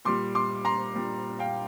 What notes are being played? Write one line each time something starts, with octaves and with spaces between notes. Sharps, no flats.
A#2 G3 C6 D6
C6 D6
A#5 C6
A#2 G3
F5 G5